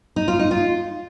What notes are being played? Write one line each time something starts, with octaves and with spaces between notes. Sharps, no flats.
D#4
F4
D#4
F4